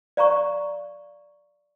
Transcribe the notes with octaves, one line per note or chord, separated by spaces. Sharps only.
D5 F5 A#5 C#6